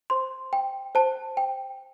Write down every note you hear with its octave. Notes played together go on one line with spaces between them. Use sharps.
C5 C6
G5
C5 A5
G5